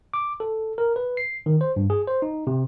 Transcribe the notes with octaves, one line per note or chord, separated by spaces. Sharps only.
D6
A4
A#4
B4
C7
D#3
C5
G2
G#4
C5
D#4
C3